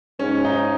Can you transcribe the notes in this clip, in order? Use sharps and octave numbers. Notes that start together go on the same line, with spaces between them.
G#2 C#4
D#4